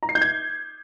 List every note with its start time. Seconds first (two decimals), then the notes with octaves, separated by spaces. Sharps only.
0.03 A#5
0.09 C7
0.15 G6
0.22 G#6